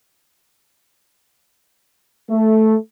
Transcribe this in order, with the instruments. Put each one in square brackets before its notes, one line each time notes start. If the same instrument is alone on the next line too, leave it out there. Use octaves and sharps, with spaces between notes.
[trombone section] A3